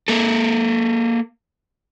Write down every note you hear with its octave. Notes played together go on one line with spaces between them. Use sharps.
A#3 A4